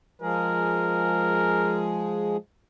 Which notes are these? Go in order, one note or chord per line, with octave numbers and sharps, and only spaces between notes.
F3 G#3 G#4 A#4